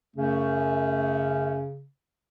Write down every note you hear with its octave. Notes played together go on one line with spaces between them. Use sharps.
F#2 C#3 A3 C#4